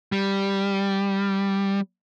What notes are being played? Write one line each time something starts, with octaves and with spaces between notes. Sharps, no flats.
G3